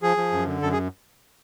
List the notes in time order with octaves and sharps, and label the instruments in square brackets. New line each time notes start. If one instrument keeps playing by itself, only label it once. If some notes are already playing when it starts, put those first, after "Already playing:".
[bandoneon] F3 G#4
F3
F#2
D3
F#2 A4
G#4